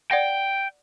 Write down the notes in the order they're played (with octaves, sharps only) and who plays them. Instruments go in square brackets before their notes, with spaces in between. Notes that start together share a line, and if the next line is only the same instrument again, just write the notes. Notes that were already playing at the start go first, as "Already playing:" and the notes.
[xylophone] D5 F#5 A#6 [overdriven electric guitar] G5